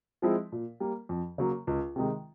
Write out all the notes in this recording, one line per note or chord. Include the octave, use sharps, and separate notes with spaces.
F3 G#3 C4 E4
A#2
G3 A#3
F2
C#3 F#3 A#3
C#2
C3 D#3 G#3